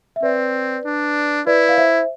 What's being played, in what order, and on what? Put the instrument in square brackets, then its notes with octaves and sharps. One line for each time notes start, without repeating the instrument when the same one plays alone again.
[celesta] E5
[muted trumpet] C4 [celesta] B4 D5
[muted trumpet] D4
[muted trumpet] E4 [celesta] B4 D5
[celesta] F5
C5 E5